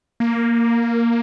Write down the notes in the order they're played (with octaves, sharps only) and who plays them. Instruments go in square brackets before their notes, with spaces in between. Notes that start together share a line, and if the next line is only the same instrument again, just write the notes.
[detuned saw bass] A#3